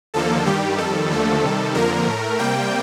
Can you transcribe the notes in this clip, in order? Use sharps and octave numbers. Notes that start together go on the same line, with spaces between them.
D#2 D3 F3 A#3 A4
G2 D#3 G3 G4
F2 D#3 G3 A4
D#2 D3 F3 A3
C3 D#3 G3
F2 D3 F3 A#3 A#4
A2 A3
C3 G3 A#3 G5